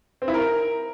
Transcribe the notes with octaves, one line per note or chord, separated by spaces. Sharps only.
C4
E4
A#4